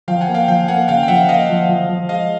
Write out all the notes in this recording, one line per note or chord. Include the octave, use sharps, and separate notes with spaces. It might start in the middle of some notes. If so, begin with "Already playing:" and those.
F3 F5 G5
F#5 G#5
A#3
F5 G5
F3 F5 G5
A#3 F#5 G#5
C#3 F5 G5
G5
F3 E5 F#5
A#3 D#5 F5
F3
F3
F3
G#3 D#5 F5